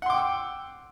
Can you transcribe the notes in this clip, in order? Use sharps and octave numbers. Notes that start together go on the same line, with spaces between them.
F#5 G5 C6 D6 E6